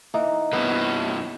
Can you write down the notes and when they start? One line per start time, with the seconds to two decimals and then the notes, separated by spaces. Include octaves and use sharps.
0.14 E3 A#3 D#4
0.53 G2 E3 B3
1.10 G5